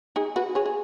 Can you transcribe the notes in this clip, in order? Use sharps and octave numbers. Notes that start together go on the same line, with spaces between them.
D#4 G#4
F#4 B4
G#4 C#5
G#4